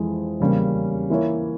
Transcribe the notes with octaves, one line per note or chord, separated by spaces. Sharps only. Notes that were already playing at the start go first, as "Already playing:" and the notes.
Already playing: F2 E3 G#3
E2 C#3 G3 A#3 C#4
E3 A#3 E4 A#4 C#5